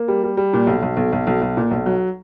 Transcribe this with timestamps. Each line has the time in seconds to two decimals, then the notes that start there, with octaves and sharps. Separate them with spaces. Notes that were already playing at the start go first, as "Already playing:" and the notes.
Already playing: A#3
0.08 G3
0.24 G3
0.37 G3
0.53 A#2
0.67 B1
0.83 B1
0.97 B1
1.13 B1
1.27 B1
1.42 B1
1.57 A#2
1.71 B1
1.86 F#3